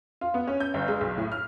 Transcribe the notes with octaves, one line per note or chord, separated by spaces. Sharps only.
F4
B3
C#4
G6
G1
G#3
B1
A2
F6